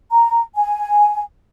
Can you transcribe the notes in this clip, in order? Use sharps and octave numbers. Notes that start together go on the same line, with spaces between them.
A#5
G#5